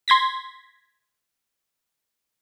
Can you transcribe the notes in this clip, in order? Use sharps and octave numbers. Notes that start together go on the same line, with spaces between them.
C6 G#6 A#6 B6